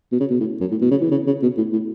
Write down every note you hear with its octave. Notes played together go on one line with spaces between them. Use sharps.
B2
C#3
B2
A2
F#2
A2
B2
C#3
E3
C#3
C#3
B2
A2
A2